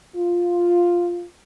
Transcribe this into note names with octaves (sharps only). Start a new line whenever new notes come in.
F4